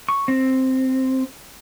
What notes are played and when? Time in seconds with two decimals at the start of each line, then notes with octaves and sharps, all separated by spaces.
0.09 C#6
0.28 C4